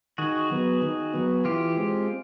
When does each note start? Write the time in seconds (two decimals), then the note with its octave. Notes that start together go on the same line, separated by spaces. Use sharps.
0.18 D#3 F#4 G#4
0.50 F#3 B3
0.82 D#3
1.13 F#3 B3
1.45 E3 F4 G4
1.77 G#3 C4